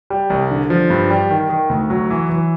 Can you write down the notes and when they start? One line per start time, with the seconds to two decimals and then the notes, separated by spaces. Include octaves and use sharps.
0.10 G3
0.30 C2
0.51 D3
0.70 F3
0.90 G2
1.10 G3
1.31 D#3
1.50 D#3
1.69 D2
1.90 F#3
2.11 E3
2.29 E3